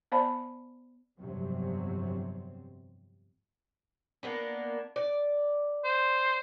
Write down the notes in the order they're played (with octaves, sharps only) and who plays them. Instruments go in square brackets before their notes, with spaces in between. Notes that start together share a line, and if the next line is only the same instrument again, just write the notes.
[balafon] B3 C5 D5 F5 A5 B5
[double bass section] G1 F2 C3 F#3 C4
[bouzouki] A#3 B3 D4
D5
[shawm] C5